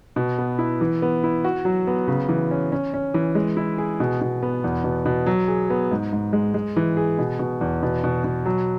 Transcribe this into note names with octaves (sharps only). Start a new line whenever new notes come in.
B2
B3
E4
E3
B3
E4
F#4
F#3
B3
C#3
E3
C#4
C#4
C#4
E3
G#3
E4
G#4
B2
B2
B3
E2
B2
B2
F#3
G#4
B3
G#2
G#2
G#3
G#3
E3
G#4
B2
B2
E2
B2
B2
B2
F#3